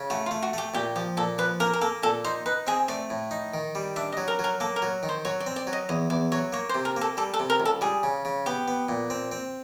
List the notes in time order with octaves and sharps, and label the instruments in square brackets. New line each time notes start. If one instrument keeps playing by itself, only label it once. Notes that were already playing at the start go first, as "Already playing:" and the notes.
Already playing: [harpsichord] C#3
[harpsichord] A3 [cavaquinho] F#4
[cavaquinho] F4
[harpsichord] A3
[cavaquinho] F#4
[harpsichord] A3 [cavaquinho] G4
[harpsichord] A#2 [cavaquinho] G4
[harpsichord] F3 [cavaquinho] G4
[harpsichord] A#2 [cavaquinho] A4
[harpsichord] F3 [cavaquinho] B4
[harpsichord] A#3 [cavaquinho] A#4
[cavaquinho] A#4
[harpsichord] A#3 [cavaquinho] A4
[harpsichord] A#2 [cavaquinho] A4
[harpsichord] D#4 [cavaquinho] C5
[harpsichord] D#4 [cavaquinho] B4
[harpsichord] C4 [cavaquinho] G#4
[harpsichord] A3 [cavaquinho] D5
[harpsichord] A2
D#4
D#3
G3
[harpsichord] D4 [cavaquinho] E5
[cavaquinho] D#5
[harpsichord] F#3
[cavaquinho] A#4
[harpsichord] F#3 [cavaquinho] A#4
[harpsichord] A#3 [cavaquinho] A4
[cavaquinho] A#4
[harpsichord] F#3
D#3
[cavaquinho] C5
[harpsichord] F#3 [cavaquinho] C#5
[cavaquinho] D5
[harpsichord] C4
[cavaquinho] D5
[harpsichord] F#3
[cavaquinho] D#5
[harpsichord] E2 [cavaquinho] D#5
[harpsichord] E2 [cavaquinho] D5
[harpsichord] F#3 [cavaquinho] C#5
[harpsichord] A#3 [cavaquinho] C#5
[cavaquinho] C5
[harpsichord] C3
[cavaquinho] A#4
[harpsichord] A#3 [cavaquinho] A4
[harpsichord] G3 [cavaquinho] A4
[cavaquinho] A4
[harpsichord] C3
[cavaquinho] A#4
[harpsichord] C#2
[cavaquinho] A4
[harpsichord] G3 [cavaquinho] G#4
[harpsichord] C#3
C#3
[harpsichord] B3 [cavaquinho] G4
[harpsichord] B3
A#2
C4
C4